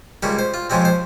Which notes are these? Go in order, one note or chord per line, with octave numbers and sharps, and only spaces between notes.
C#2 C#3 G3 A#3 G4
C5
F4
F2 C#3 F3 G#3 C4 G4
C5